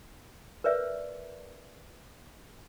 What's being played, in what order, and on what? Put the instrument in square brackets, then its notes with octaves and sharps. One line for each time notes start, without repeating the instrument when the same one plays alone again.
[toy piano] A#4 B4 D5 E5